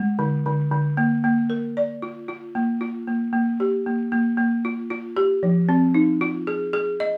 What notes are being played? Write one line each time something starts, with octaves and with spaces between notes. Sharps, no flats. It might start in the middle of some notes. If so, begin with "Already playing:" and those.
Already playing: G#3
D3
D3
D3
A#3
A#3
A#4
D5
F4
F4
A#3
F4
A#3
A#3
G4
A#3
A#3
A#3
F4
F4
G4
F3
C4
D#4
F4
G#4
G#4
D#5